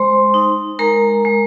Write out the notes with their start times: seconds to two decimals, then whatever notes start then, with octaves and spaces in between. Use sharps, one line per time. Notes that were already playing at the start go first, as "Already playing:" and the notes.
Already playing: G#3 C5 C6
0.34 D#4
0.79 G#3 A#4 A#5
1.25 G#3